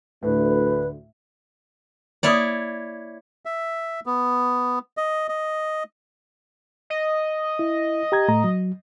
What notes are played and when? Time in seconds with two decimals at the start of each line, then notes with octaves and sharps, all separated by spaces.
0.23 D2 A2 B4
2.23 A#3 E4 C#5 D5 D#6
3.45 E5
4.06 B3
4.97 D#5
5.29 D#5
6.90 D#5
7.59 E4
8.12 G4 A#5 G#6
8.28 A2 A3 A#5
8.44 F#3